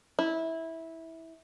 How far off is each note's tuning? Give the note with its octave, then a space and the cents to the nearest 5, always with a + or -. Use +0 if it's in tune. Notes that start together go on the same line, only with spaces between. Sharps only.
E4 -15